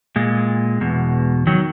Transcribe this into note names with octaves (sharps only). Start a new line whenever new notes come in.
A#2 G#3
E2 B2
D#3 F#3